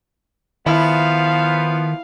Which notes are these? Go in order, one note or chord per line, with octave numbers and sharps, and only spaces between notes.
D#3 F3 B3 E4 F5